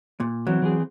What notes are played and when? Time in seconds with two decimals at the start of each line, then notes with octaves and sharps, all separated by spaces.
0.20 A#2
0.47 E3 F#3 C4
0.62 E3 C4 G#4